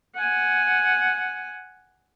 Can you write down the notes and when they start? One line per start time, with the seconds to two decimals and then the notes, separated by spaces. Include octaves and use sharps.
0.15 F#5 G#5